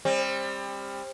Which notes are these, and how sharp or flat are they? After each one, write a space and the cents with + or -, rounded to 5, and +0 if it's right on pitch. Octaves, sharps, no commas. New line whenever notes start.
G3 +25 C4 +30